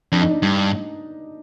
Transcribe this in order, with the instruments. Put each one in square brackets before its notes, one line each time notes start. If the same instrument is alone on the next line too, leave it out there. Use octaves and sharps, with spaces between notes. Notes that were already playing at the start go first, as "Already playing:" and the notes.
[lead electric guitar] F2 [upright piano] D4
[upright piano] D#4
D4
[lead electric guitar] G2